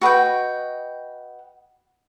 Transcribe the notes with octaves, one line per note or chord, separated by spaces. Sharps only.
F#4 B4 D#5 G5